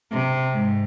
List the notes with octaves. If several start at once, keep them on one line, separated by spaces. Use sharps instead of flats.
C3
G#2